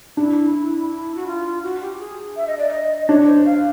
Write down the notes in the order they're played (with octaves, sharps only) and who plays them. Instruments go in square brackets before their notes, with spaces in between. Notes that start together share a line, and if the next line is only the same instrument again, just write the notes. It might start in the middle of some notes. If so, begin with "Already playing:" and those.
[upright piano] D4 [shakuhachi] E4
[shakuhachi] E4
E4
F#4
F4
F#4
G4
G4
G#4
E5
D#5
D5
D#5
[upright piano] D4 [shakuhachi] C#5
[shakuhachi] C5
F5